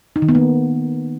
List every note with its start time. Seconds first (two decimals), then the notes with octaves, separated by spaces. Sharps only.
0.16 D#4
0.22 D#3
0.29 B3
0.35 A#3